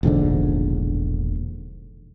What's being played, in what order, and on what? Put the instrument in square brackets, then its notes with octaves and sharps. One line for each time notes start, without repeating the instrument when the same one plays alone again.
[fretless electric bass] E1 A#1 G#2 D3